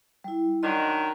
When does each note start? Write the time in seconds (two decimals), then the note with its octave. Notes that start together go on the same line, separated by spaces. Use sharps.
0.24 G3 E4
0.63 D#3 F#3 D4 D#5 C6